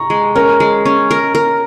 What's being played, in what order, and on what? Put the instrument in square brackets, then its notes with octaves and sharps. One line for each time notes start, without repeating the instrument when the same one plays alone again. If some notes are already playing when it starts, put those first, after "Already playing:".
Already playing: [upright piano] A#5 C#6
[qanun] G#3
[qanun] C#4 [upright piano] A#4
[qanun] G#3
C#4
A#4
A#4